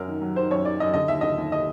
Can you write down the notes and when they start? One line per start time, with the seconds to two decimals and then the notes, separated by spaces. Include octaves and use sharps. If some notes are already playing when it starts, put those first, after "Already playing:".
Already playing: F#2 F#3 A#4
0.08 D#3
0.22 F#3
0.36 D#3 C5
0.51 F#2 C#5
0.65 D#3 D5
0.80 F#2 D#5
0.94 D3 D#5
1.08 D#2 E5
1.21 D3 D#5
1.38 D#2
1.52 D#5